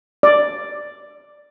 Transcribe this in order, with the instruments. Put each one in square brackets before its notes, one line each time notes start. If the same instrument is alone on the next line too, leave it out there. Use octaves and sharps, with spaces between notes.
[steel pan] D5